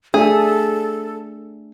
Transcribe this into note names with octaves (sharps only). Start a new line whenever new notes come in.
A3 D4 G#4 A4 E5